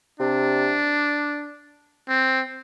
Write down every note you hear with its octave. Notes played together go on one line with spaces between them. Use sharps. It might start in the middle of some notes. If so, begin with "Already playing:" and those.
C3 D4
C4